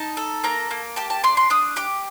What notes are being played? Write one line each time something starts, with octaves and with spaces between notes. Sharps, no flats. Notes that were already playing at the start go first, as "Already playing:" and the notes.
Already playing: D#4 A5
A4
A#3 A#5
A#3
G4 A5
A5
D4 C6
C6
D4 D#6
G4 D6